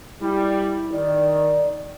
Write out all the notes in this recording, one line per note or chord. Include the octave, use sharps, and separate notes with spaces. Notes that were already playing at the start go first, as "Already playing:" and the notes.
G3 E4
D#3 D5